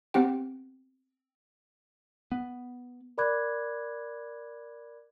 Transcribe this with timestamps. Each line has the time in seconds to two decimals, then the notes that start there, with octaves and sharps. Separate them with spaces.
0.14 B3 C4 G4 G5
2.32 B3
3.18 A#4 D5 B5 D6 F#6 G#6